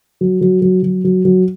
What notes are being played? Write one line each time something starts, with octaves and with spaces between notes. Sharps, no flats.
F#3
F#3
F#3
F#3
F#3
F#3